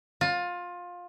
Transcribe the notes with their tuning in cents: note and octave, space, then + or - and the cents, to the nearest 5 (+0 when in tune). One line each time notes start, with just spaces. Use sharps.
F4 +20